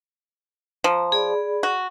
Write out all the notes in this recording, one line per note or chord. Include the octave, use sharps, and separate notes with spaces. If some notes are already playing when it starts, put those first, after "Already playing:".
F3 A#5
G#4 D5 B5
F#4